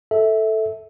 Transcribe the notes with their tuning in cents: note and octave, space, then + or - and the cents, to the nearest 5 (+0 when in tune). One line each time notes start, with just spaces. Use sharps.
A4 +0 E5 -20